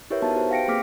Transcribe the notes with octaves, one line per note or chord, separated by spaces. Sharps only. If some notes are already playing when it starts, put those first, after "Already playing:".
E4 G4 A#4 B4 C#5 E5
B3 D#4 F#4 E5 A5
F#4 G4 B4 C5
F5 G5 A#6 C#7 D7
A#3 C4 G#4 D6 F6 B6